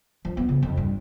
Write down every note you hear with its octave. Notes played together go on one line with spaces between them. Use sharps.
F3
B3
C#3
F2
G2